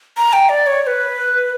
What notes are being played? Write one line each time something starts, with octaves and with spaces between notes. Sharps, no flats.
A#5
G5
D5
C#5
C#5
B4